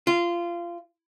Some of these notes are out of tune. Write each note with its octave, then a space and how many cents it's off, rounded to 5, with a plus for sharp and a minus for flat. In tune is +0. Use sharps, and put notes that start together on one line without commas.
F4 -20